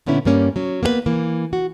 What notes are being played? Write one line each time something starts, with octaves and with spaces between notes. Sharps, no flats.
A#2 D3 B3 C#4 E4
G2 G3 A#3 C#4
F#3 C#4
A#3 B3 G#4 B4
E3 A#3
F#4